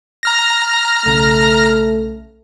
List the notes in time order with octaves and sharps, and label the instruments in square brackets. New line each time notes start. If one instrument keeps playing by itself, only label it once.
[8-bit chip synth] A#5 F6 A#6
[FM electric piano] B1 C#3 [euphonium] A3